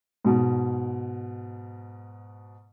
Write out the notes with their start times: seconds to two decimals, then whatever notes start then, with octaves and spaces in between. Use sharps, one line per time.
0.24 G#2 B2